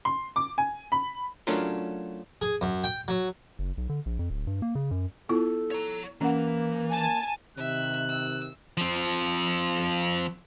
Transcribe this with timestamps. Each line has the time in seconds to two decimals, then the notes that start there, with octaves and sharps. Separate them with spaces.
0.05 C6
0.36 D6
0.58 G#5
0.92 B5
1.47 F#3 A3 C#4 D4 F4 A#4
2.42 G#4
2.61 F#2
2.84 G5
3.08 F#3
3.59 F#1
3.77 B1
3.89 D3
4.06 A#1
4.19 F2
4.30 D1
4.47 G2
4.62 A#3
4.75 C#3
4.91 F#2
5.29 B3 E4 F4 A4
5.71 C#5 A#5
6.21 E3 A#3 C#4 F#5
6.90 G#5 A5
7.58 C3 D#3 E5 F#6
8.09 E6
8.77 F3 C4